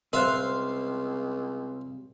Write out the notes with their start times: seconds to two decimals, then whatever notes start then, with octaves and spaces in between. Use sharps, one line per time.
0.13 C#2 C3 G3 A#4 C5 E5 F5 C6